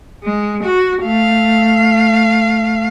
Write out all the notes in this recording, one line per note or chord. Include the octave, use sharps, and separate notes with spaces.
G#3
F#4
A3 F5